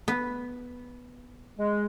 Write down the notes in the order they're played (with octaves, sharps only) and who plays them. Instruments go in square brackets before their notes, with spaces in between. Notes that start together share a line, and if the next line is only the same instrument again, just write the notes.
[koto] B3
[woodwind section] G#3